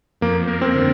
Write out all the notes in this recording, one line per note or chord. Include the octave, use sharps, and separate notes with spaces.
F2 A#3
A#3
C4
D3